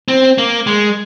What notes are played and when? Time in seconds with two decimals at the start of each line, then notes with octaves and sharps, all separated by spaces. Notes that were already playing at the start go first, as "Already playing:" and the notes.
0.08 C4
0.38 A#3
0.67 G#3